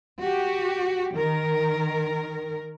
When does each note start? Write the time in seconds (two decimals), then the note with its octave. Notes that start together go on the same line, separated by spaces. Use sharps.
0.20 F#4 G4
1.14 D#3 A#4